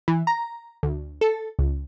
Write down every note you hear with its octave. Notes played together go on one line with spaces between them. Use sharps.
E3
A#5
D2
A4
C#2